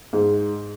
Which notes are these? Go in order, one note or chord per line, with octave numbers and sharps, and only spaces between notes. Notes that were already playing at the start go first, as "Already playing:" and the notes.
G#2